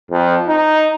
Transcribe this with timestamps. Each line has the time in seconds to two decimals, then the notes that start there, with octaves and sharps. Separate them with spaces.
0.11 F2
0.48 D#4